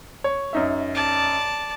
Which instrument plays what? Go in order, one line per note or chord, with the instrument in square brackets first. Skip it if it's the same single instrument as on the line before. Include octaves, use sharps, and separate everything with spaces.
[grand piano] C#5
F#2 D#4 E5
[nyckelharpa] D5 A5